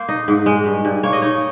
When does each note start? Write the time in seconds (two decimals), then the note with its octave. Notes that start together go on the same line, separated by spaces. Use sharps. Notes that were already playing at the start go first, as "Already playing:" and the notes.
Already playing: A#3 C5
0.09 D#4
0.28 G#2
0.46 G#3
0.66 G2
0.85 G2
1.03 A#3 C#5
1.13 D#5
1.22 D#4 C#5